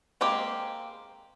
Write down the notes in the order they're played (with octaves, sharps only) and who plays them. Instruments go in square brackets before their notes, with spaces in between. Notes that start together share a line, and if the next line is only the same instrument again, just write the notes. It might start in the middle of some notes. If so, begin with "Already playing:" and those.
[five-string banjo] G#3 A#3 C4 G4